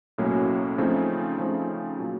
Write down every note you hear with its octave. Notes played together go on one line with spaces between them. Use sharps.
B1 A2 F#3 A#3 C#4
C#3 F3 A3 C4 D#4
C#3 F3 A3 C4 D#4
A#2 F#3